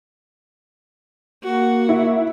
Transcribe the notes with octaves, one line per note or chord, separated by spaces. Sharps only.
A#3 F#4
E4